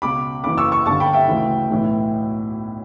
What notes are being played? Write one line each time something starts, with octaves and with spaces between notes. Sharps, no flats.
C#2 B2 B5 D6
F#1 F#2 E3 B5 D6
C#6 E6
C#6 E6
G1 G2 D3 A5 C#6
G5 B5
E5 G5
D2 C#3 E3
B1 A2 E3